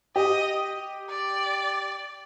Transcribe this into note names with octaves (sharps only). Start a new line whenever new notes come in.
G4 D#5
D5